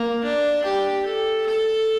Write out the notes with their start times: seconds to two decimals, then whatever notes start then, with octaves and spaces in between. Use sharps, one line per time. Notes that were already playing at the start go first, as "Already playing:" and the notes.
Already playing: A#3
0.23 D4
0.64 G4
1.05 A4
1.47 A4